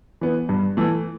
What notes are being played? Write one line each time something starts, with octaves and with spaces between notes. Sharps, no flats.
E3 B3
G2
E3 A3